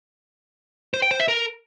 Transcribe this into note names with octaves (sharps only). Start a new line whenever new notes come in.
C5
G5
C5
E5
A#4